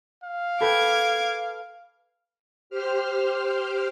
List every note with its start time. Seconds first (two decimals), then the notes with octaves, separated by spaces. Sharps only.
0.24 F5
0.61 A4 B4 G5 D6 G#6
2.70 G4 C5 F6